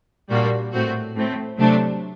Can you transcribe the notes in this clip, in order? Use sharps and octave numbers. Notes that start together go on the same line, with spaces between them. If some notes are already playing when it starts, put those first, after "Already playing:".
A#2 G3 A#3 D4 F#4
A2 A3 C4 F#4
A2 A3 C4
C3 F#3 A3 D4